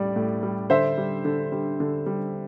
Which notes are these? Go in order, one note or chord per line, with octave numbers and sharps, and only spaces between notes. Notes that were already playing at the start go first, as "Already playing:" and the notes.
Already playing: A2 G3 D5
A2
G3
D3 C5 E5
G3
D3
G3
D3
G3